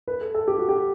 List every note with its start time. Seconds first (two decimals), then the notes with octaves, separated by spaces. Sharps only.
0.08 B4
0.21 A4
0.35 A4
0.48 G4
0.58 F#4
0.69 G4